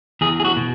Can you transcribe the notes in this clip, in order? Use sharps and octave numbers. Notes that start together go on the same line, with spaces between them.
E2 G#4
G#4
F#4
B2